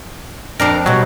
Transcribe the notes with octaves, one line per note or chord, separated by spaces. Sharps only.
F2 D4 A#4 C5
B2 F#3 G3